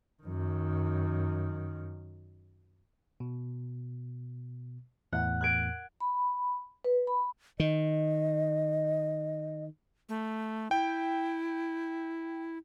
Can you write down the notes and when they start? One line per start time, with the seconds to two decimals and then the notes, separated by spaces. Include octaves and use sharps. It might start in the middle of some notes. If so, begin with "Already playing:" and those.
0.23 F#2 D#3
3.20 B2
5.13 E2 A2 F#5
5.41 F#6 G#6 D7
6.00 B5
6.85 B4
7.07 B5
7.60 D#3 D#5
10.09 A3
10.71 E4 G5